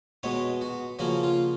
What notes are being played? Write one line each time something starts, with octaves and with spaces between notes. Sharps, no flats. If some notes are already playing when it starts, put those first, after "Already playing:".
B2 G#3 B3 C#5
F#4
C#3 F3 A#3 C#4 F#4
F4